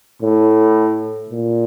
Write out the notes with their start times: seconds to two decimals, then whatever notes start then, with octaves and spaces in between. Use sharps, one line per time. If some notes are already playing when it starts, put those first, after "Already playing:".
0.22 A2
1.30 A#2